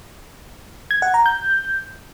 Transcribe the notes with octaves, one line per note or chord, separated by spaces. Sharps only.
G#6
F#5
A#5
G6